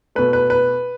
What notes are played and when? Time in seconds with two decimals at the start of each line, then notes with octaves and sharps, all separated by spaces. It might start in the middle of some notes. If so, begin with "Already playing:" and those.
0.15 B2 A3 B4
0.33 B4
0.50 B4